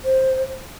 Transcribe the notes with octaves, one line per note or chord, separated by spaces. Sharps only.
C5